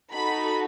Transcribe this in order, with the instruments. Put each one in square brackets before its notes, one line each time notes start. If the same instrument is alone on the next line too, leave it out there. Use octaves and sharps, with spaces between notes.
[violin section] D#4 F#4 A4 B5